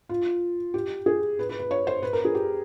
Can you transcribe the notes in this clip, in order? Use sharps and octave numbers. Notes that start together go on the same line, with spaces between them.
F4
G4
G#4
B4
B4
B4
C#5
C5
B4
A#4
G#4
G4